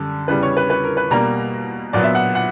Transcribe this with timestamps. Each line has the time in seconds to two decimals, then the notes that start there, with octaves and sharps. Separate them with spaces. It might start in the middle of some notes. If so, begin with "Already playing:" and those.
Already playing: F#2 D3 G3
0.28 E2 C#3 G3 B4
0.43 C#5
0.57 B4
0.70 B4
0.84 A#4
0.97 B4
1.11 B2 G3 A#3 A#5
1.93 A#2 F#3 B3 D5
2.04 E5
2.15 F#5
2.35 F#5